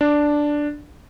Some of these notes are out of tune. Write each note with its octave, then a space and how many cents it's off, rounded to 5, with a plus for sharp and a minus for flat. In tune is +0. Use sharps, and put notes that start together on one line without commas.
D4 +0